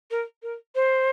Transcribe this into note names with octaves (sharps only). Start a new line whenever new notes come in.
A#4
A#4
C5